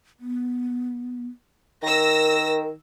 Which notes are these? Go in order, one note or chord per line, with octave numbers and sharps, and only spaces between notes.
B3
D#3 A#4 E6 A#6